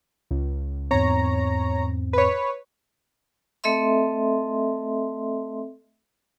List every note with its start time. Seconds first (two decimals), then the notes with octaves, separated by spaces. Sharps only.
0.31 C#2
0.91 E2 G#2 C4 C#5 A#5
2.13 B4 C#5
3.64 A3 C4 A4 D#5 E5 C6